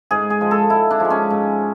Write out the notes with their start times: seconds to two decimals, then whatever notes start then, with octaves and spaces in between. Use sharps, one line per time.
0.11 G#2 G#4
0.30 G#4
0.41 F3 G#3
0.51 A4
0.70 G#2 E4
0.91 D4
1.00 F3 G#3
1.10 C#4
1.30 G#2